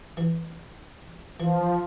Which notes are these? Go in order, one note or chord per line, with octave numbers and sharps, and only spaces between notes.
E3
E3 F3